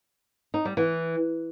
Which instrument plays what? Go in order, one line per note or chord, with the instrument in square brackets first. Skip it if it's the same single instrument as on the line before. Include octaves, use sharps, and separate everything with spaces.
[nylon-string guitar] D#4
G3
E3